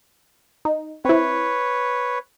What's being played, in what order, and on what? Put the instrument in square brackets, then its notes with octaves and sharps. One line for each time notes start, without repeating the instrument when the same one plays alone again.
[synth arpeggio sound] D#4
[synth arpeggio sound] C4 E4 [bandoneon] B4 C#5